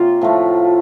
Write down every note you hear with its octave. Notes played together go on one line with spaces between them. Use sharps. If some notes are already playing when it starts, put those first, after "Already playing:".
Already playing: C3 F#3 A#3 F4
A2 F3 A3